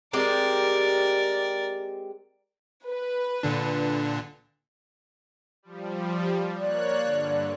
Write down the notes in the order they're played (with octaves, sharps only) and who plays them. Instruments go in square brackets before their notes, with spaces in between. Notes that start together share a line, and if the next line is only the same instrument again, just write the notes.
[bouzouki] G#3 C4 G4 [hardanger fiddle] A#4 D5
[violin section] B4
[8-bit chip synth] A#2 D3 D4
[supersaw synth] F3 G3
[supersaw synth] A#3 C#5 F#6 [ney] D5
[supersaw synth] G2 D3